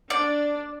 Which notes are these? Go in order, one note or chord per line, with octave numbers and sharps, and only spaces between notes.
D4 D5